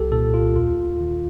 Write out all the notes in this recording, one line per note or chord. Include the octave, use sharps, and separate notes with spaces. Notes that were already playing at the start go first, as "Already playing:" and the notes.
Already playing: C2 G4 A4
A#2 A4
F4
D#2 F4
D#3